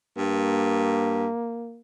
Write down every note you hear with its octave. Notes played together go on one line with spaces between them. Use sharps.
G2 A#3